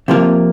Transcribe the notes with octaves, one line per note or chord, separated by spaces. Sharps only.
C3 F3 A#3 F4